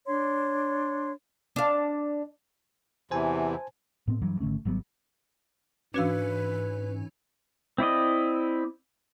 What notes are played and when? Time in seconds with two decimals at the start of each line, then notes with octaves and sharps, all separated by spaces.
0.07 D4 C#5 C6
1.56 D4 F5
3.11 E2 C3 E3 C5 G#5 A5
4.07 A2 B3 C4
4.22 G2 E3 F#3
4.40 G#1 D3 A3 C#4
4.65 G#1 F#3 G3 B3
5.94 G#2 E3 C#4 D4 F#4 B4 F5
7.78 C4 E4 D5 D#5